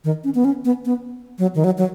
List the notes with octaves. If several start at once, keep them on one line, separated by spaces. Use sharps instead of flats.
D#3
C#4
B3
C#4
B3
B3
F#3
D#3
F#3
F#3